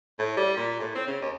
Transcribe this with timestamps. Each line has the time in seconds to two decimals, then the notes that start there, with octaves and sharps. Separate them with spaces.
0.19 A2
0.37 G3
0.57 A#2
0.80 A2
0.95 C4
1.07 C#3
1.22 D#2